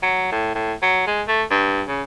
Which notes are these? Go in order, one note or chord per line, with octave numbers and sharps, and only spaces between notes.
F#3
A2
A2
F#3
G#3
A3
G2
C#3